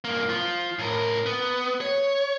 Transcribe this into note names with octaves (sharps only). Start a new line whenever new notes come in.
G2 A#3
F3 F4
A2 A#4
B3
C#5